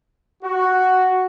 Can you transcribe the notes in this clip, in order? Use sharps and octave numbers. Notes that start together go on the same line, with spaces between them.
F#4